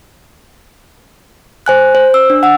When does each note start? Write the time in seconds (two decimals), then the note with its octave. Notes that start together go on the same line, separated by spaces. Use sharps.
1.66 C5 G#5 F#6
1.95 C5
2.14 E6
2.30 D4
2.43 F#5 E6